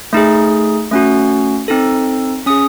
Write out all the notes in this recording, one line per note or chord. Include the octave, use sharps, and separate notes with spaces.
A3 D#4 G#4
A3 C#4 F#4
C4 D#4 A4
C#4 G#4 D#6